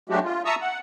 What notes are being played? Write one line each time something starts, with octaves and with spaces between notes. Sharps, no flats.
F#3 G#3 A3 D4 F#4 G4
F4
E5 A5 A#5 C#6 D#6 E6
F#5